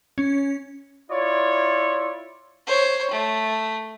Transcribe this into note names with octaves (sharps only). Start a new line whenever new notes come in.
C#4
E4 F4 C#5 D5
C5 C#5
A3